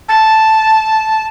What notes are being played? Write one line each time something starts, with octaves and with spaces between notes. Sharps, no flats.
A5